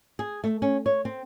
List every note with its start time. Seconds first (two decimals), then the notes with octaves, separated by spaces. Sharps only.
0.19 G#4
0.44 A3
0.62 C#4
0.86 C#5
1.05 C4